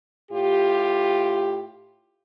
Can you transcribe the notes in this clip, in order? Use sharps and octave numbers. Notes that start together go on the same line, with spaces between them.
A2 F4 G4